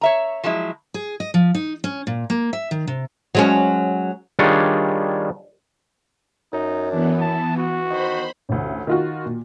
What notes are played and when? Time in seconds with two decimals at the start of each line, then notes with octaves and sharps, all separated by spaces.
0.01 C#5 E5 A#5
0.44 F3 F#3 G#3 E4
0.94 G#4
1.20 D#5
1.34 F3
1.55 D#4
1.84 C#4
2.07 A#2
2.30 A#3
2.53 E5
2.71 D#3
2.87 C3
3.35 F#3 G#3 C#4
4.39 D#3 G3 D4 F4 G#4 C#5
6.53 F#2 D#4
6.91 E3 B3 D4
7.21 A5
7.57 F#4
7.90 D#3 C5 B5
8.49 A1 D2
8.87 D#3 F4 F#4
9.26 A#2